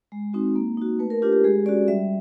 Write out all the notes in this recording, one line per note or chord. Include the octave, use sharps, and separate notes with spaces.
G#3
C4 D#4 F#4
A#3
D#4 F#4
A3 B4
A#4
D4 F4 G4
G4
G#3 G#4
C#4 F#4 D5
G3 E5